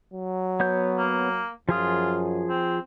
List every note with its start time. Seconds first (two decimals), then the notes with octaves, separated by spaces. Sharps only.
0.14 F#3
0.60 B3 C#5 G6
0.98 A#3
1.69 F#2 F3 F4 G#4 D#6
2.49 C4